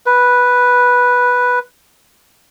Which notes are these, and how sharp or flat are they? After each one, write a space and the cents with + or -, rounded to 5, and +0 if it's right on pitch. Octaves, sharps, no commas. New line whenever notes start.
B4 -5